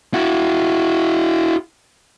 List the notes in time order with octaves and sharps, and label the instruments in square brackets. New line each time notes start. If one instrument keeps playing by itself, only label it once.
[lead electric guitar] E4 F#4